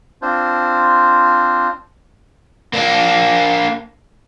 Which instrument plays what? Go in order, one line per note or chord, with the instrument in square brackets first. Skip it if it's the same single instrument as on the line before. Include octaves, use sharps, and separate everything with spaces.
[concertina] C4 D4 F4 C5
[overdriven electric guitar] A#3 D4